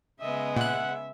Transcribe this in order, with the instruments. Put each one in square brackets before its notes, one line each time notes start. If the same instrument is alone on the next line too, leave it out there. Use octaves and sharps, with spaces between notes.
[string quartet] C#3 G#3 B3 [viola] D#5 E5
[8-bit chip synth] A#2 F#6 [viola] E5 [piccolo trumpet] F#5